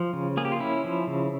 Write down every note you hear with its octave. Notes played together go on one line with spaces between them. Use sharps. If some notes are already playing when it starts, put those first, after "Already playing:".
Already playing: F3
C#3
A#3 G#4
G4
F4
C#4 E4
F3
C#3